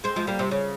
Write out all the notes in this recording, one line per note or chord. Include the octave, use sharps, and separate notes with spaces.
G#3 C4
F3 G#3
G3 A#3
C3
C#3